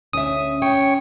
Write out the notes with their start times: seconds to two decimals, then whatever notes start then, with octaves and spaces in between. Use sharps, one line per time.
0.13 D2 C#4 E5 D#6
0.62 C#5 G5